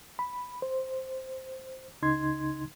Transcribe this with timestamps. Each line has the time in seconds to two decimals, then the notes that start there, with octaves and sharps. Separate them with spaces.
0.19 B5
0.62 C5
2.02 C#2 C#3 D#4 C6 G#6